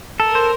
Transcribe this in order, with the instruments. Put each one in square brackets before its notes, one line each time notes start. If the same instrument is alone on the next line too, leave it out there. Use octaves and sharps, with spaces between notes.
[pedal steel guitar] A4 [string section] A#4
[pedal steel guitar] C5